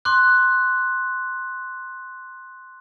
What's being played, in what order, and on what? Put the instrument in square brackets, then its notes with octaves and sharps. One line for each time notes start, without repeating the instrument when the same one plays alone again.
[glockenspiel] C6 D6 F#6